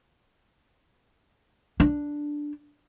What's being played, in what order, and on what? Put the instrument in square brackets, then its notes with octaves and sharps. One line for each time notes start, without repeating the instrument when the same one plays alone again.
[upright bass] D4